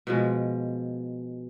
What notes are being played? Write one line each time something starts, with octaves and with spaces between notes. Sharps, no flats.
B2 F3 G#3